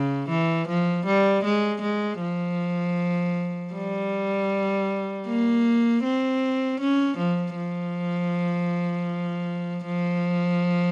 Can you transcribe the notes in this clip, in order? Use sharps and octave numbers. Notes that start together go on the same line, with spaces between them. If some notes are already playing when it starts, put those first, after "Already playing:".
Already playing: C#3
E3
F3
G3
G#3
G#3
F3
G3
A#3
C4
C#4
F3
F3
F3